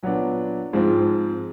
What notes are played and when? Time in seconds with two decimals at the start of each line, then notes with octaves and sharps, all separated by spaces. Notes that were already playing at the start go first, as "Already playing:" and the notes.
0.03 A#2 F#3 B3 D4
0.73 G#2 F3 G#3 C4 F4